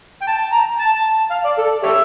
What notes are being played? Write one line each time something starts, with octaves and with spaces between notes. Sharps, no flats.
G5
A5
A#5
A5
F5
D5
A4
G4 C#5 E5